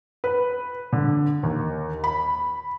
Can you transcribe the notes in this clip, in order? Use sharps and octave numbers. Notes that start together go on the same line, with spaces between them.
B4
D3
D#2
B5